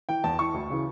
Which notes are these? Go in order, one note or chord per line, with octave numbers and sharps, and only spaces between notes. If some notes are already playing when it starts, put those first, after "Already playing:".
E3 G5
E2 A5
E3 C#6
D2
C#3 E3